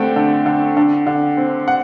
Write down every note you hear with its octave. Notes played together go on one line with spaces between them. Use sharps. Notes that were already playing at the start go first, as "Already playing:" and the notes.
Already playing: D3 A3 C4 G5
D3
D3
D3
D3
C4
F#5